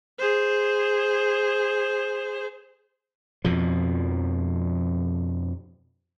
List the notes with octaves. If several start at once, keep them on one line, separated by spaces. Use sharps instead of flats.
G#4 C5
F2 B2 F3